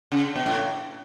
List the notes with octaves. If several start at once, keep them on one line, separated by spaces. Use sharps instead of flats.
C#3
B2
A2